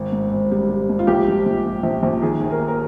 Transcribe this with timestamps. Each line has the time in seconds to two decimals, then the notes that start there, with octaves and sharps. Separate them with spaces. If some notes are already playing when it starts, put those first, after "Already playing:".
Already playing: G#1
0.12 G#2
0.32 G#1
0.51 G3
0.69 G3
0.89 G#2
0.99 F4
1.07 A#1 G4
1.27 G3
1.46 A#1
1.65 A#2
1.83 A#1
2.03 A#1
2.21 D#3 G#4
2.41 D#2
2.50 A#4
2.59 D#2
2.68 A#4